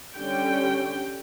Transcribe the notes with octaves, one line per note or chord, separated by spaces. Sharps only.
D3 G3 C#4 G5